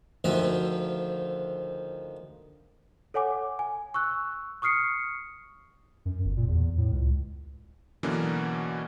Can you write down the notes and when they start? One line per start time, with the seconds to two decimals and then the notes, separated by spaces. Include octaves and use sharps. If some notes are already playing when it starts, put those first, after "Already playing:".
0.24 D2 D#3 F3 E5
3.14 A4 C#5 F#5 G#5 D6
3.59 G#5
3.94 C#6 E6 F#6
4.62 C#6 D#6 F6 C7 C#7
6.05 F#2
6.25 G1
6.37 A#2
6.48 E2
6.77 A2
6.92 C#2
8.03 B2 D3 E3 F#3 A#3 C#4